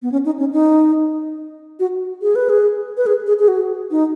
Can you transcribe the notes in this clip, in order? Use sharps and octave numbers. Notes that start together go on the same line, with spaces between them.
B3
C#4
D#4
C#4
D#4
F#4
G#4
B4
G#4
B4
G#4
G#4
G#4
F#4
D#4